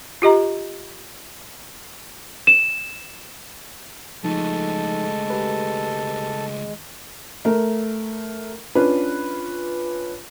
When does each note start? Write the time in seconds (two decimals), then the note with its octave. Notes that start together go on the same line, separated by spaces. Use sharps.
0.22 F4 G4 D#5 A#5
2.47 E7
4.24 C#2 F3 G#3 A3 D#4 A4
5.30 G4 B4
7.45 A3 A#4
8.75 C#4 D4 F4 B4